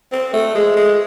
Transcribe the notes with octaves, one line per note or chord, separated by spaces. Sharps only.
C4
A3
G#3
G#3